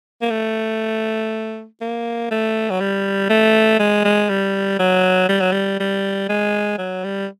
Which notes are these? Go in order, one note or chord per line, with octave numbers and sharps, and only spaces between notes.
A#3
A3
A#3
A3
F#3
G3
A3
G#3
G#3
G3
F#3
G3
F#3
G3
G3
G#3
F#3
G3